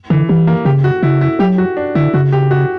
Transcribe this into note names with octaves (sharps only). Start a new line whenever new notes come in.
D3 E3
E3 G3
A#3
C#3 G4
F#4
C#3 E4
E4
F#3 G4
F#4
D4
D3 E4
C#3 F#4
G4
F#4